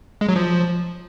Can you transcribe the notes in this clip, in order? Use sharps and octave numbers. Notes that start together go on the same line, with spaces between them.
G#3
F#3
F3